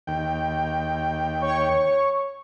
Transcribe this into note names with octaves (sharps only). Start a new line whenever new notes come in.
D#2 G5
C#5 C#6